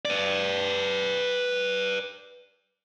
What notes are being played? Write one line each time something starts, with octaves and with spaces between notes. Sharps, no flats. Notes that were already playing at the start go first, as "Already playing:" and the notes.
B4 D5